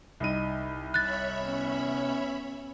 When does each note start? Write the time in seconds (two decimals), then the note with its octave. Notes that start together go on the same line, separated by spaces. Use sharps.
0.20 C2 D#4 D#7
0.94 C#5 E5 B5 F#6 A6
1.43 B3 C#4